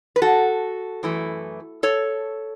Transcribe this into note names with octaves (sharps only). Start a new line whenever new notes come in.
B4
F#4 A4
F#2 E3 A3
A4 C#5